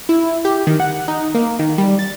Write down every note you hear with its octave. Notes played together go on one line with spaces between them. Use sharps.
E4
G4
D#3
F#5
D#4
A#3
D#3
G3
A6